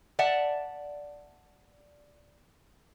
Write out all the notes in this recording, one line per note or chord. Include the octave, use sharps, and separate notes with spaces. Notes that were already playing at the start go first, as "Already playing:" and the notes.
D5 E5 F#5 A5